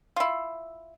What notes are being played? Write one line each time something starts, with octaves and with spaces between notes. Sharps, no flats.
E4 F4